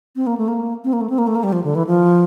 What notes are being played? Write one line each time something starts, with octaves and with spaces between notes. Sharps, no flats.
C4
A#3
A3
A#3
C4
A#3
A3
C4
A#3
A3
A#3
G3
F3
D3
E3
F3